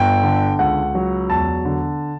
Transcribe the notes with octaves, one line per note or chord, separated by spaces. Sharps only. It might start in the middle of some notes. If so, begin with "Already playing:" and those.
Already playing: G1 G5
D3
C#2 F#5
F#3
E1 A5
D3